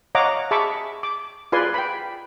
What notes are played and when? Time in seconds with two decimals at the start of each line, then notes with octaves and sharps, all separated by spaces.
0.15 C#5 D#5 F5 F#5 A#5 D6
0.51 G#4 E5 A5 B5 C#6 D6
1.03 D6
1.52 F4 G#4 B4 D5 G#5 C6
1.74 G5 B5